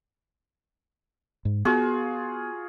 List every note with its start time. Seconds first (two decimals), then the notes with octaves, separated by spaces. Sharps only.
1.45 G#2
1.65 B3 F4 F#4 G#4